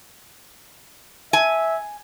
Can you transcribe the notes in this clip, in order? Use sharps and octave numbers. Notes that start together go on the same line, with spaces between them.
E5 G#5